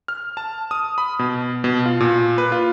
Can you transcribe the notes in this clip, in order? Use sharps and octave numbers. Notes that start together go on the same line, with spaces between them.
F6
A5
D#6
B5
B2
B2
F4
A#2
B4
F4